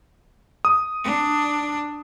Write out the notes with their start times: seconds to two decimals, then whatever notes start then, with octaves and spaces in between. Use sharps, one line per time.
0.65 D#6
1.04 D4